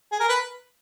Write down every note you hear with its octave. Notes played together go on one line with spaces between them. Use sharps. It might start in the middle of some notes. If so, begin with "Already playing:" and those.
G#4
A#4
B4